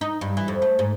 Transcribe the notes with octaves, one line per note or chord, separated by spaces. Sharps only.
D#4
G2
E3
F2
A3
G#2